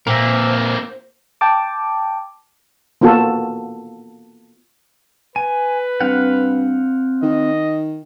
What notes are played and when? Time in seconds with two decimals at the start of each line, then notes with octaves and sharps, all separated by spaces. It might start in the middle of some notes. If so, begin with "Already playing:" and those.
0.07 A#2 A#3 C4 A#4 C5 E5
1.41 G5 A5 D6
3.01 A#3 B3 F4 F#4 A4
5.36 B4 G#5
6.01 G2 C4 F5 F#5
7.23 D#3 D#5